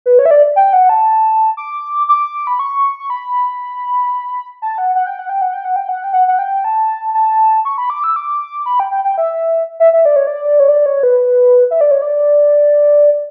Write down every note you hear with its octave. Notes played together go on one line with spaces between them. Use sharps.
B4
C#5
E5
D5
G5
F#5
A5
D6
D6
B5
C#6
C#6
B5
A5
F#5
F#5
G5
F#5
G5
F#5
G5
F#5
G5
F#5
G5
F#5
F#5
G5
A5
A5
C#6
B5
D6
E6
D6
B5
G5
G5
G5
E5
E5
E5
D5
C#5
D5
C#5
D5
C#5
B4
E5
D5
C#5
D5